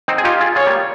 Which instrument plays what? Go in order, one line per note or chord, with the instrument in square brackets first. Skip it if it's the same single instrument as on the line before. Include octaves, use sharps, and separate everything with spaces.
[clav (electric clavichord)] C4 D#4
G#4
[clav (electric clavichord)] D#4 G4 [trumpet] F4
[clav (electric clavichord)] F4 G#4
[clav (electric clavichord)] F4 G#4 [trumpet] C#5
[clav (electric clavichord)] G3 A#3